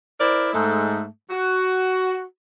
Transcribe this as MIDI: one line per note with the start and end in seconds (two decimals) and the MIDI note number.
0.19 0.53 64
0.19 0.53 70
0.19 0.53 72
0.19 0.53 74
0.53 1.05 44
0.53 1.05 56
0.53 1.05 57
0.53 1.05 69
1.30 2.22 66